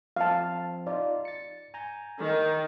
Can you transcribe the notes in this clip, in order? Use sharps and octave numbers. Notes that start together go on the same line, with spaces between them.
F3 C4 F5 A5
D#4 F4 D5
A6 C#7
G#5 A#5 G6
D#3